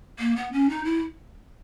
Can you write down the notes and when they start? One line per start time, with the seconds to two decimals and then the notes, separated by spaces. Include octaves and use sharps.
0.19 A#3
0.36 B3
0.52 C#4
0.69 D#4
0.85 E4